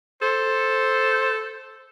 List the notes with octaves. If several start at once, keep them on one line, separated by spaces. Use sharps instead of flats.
A4 C5